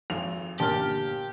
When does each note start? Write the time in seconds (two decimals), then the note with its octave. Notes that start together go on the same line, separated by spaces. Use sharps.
0.10 G#1 F2 F7
0.60 G1 A#2 G4 A#4 A5 F6